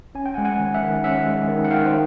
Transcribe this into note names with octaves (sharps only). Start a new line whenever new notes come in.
C#4 G#5
G5
F#5 G#5
G#3
F#5 G#5
D#3
E5 F#5
D#3
C#4 E5 F#5
G#3
D#3
F#5
D#3 F5 G5
C5